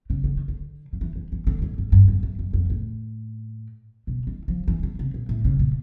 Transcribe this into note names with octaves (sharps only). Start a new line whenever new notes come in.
C#3
D3
D#3
D3
F3
E3
E3
E3
D3
G#2
G#2
G2
F2
F#2
F#2
F2
A2
B2
D#3
F3
E3
D3
C3
A#2
A2
C#3
A#2